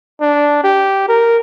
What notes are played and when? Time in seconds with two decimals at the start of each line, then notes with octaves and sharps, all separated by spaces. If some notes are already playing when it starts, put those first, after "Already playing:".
0.21 D4
0.64 G4
1.08 A#4